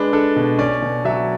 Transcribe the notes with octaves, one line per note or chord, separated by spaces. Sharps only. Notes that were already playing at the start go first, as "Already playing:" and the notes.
Already playing: G#3 D4 B4
D4 A4
B2
C#4 D5
B2
F#3 E5